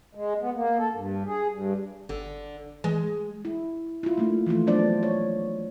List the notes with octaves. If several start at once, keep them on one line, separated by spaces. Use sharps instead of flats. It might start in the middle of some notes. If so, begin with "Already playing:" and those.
G#3
B3
A#3
A4
G2
G#4
G2
G1 D3
E3 G#3
E4
E4 F4
A3 A#3 D4
E3 F3 A3 F4
F#3 A3 B3 D4 C5 D5
C#5